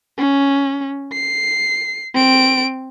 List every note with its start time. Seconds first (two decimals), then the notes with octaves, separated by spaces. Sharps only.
0.18 C#4
1.13 C7
2.14 C4 D7